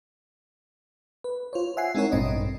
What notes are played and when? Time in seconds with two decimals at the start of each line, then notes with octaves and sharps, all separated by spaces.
1.24 B4
1.53 F4 C5 C#5
1.77 E5 F#5 G#5 C7
1.95 G#3 C4 D#4 E4 A#4 C#5
2.12 A1 G2 B2 C4 D4 D#5